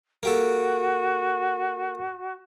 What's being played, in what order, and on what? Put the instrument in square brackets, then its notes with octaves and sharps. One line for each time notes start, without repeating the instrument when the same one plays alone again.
[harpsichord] A#3 G4 A4 [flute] F#4